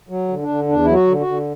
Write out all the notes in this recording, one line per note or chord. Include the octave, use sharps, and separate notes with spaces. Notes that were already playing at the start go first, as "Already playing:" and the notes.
F#3
D3
D4
D3
E2 D4
F#3 E4
F#4
D3
F#4
D3